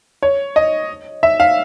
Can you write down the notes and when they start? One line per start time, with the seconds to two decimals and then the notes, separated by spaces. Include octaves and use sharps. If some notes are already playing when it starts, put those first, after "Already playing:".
0.23 C#5
0.56 D#5
1.23 E5
1.40 F5